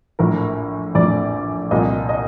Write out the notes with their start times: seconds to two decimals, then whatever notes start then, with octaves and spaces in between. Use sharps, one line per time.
0.19 A#1 A2 F3 A#4
0.95 A#1 A2 F3 D5
1.71 C2 A#2 F3 D#5
2.09 D#5